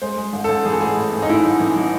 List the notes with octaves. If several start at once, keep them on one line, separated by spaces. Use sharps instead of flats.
G#3 C5
G#3
A1
A1 A4
E3 G#4
A4
A2 G#4
A2
A2
D#4
A2 E4
A1
E3
E3